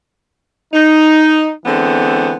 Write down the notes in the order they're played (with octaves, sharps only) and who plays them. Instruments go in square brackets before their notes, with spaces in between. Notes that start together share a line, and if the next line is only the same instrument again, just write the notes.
[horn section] D#4
D3 E3 G#3 B3 C4